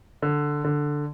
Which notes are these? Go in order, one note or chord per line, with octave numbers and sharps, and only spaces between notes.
D3
D3